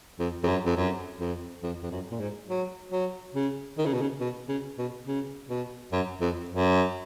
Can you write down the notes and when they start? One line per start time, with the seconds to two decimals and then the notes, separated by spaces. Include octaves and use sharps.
0.19 F2
0.44 F2
0.48 F#2
0.65 F2
0.77 F#2
1.20 F2
1.63 F2
1.83 F2
1.91 F#2
2.11 A#2
2.20 G#2
2.49 F#3
2.92 F#3
3.35 C#3
3.78 D#3
3.86 C#3
3.94 B2
4.01 C#3
4.20 B2
4.48 C#3
4.78 B2
5.07 C#3
5.49 B2
5.92 F#2
6.21 F2
6.49 F#2